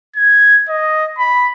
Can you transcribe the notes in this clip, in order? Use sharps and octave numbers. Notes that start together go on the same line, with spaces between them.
G#6
D#5
B5